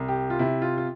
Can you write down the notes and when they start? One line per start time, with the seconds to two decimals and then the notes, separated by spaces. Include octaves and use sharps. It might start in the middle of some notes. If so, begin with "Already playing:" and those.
Already playing: C2
0.08 G4
0.30 F4
0.39 C3 E4
0.62 F4
0.78 F4